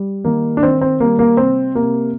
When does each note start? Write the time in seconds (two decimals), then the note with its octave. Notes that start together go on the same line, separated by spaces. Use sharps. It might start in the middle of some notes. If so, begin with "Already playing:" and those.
Already playing: G3
0.24 D#3 A#3
0.57 D4
0.63 D#3 C4
0.81 C4
1.00 G3 A#3
1.19 A#3
1.37 C3 C4
1.75 C3 A#3